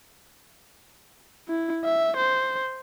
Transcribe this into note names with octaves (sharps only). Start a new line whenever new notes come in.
E4
E5
C5